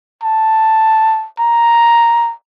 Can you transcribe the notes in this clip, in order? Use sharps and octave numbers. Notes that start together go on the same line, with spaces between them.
A5
A#5